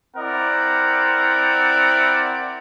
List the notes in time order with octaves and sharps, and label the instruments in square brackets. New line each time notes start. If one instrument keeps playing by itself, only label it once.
[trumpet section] C4 E4 A#4 D5 F#5